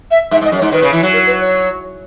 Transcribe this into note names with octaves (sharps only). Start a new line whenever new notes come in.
E5
G#2 E5
G#2
D#5
F#2
C#5
G#2
D#3 B4
C#3
E3
F#3
A#4
B4
C#5